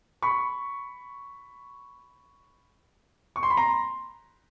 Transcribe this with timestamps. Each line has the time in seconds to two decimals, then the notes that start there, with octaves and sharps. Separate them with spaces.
0.22 B5 C#6
3.36 C#6
3.43 C6
3.50 B5
3.57 A#5 C6